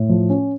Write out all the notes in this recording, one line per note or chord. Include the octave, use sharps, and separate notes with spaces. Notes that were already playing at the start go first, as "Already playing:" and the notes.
Already playing: A2
F3
C#4